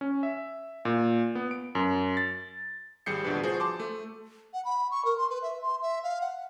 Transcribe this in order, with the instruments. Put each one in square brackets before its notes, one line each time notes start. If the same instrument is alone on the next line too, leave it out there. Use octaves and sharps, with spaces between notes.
[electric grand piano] C#4
E5
A#2
B3
D7
F#2
A6
G#1 G3 G#4 G6 C7 C#7
A1 D2 B2 F3 D4 B4
F3 F#4 G#4 C5
A5 C6 D6
A3
[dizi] F#5
B5
C#6
A#4
C6
B4
E5
C6
E5
F5
F#5